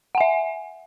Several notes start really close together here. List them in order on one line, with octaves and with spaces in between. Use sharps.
F#5 G#5 E5